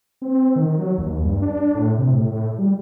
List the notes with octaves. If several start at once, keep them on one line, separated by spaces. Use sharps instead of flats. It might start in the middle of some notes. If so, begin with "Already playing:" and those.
C4
D#3
F#3
D#2
G2
D4
A2
C3
A2
G3